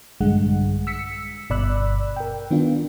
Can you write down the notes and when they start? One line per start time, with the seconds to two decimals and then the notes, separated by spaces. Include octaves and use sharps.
0.20 A#1 G2 D3 G#3 F#5
0.87 E6 B6 C#7
1.50 G1 B2 D5 B5 E6 F#6
2.16 A#4 G5
2.51 D#3 B3 D4 F4